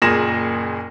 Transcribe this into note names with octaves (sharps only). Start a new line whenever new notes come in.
F#1 A#2 G#4 A#6 E7